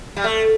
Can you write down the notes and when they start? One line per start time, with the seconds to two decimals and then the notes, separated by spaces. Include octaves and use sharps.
0.16 G3
0.24 A3